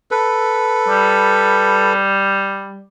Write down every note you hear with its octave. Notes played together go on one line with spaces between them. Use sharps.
A4 B4
G3